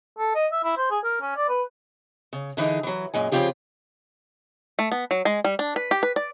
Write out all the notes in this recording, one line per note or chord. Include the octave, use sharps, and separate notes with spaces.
A4
D#5
E5
E4
C5
G#4
A#4
C#4
D5
B4
C#3
D3 E3 D#4 G#4
E3 F#3
F#2 A#2 G#3 G#5
C#3 F3 C4 F4 G4 G#4
A3
B3
F#3
G#3
G3
D4
B4
G4
B4
D5